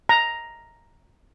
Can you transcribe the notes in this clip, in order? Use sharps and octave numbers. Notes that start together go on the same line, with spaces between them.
A#5